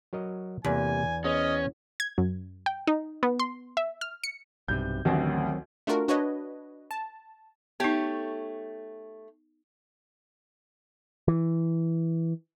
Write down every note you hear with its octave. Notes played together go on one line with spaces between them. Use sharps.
F#3 A#4 D#5
E2 C3 G3 A#3 G#5
B3 C#4 G#4 C5 D#5
G#6
F#2
G5
D#4
B3
C6
E5
F6
C#7
B1 G2 C3 G6
A1 D2 D#3 F#3 C4
A3 D4 F4 F#4 A#4
D4 F#4 B4 C#5 D#5
A5
A3 B3 D#4 G4 C#5
E3